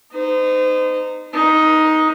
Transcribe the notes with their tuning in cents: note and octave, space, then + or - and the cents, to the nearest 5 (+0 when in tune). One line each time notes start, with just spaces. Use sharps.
D#4 -20 C5 -35
D#4 +10 B4 -40